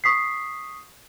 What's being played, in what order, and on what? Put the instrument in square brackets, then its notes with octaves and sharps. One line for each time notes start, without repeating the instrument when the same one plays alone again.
[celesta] C#6 D#6 B6 C7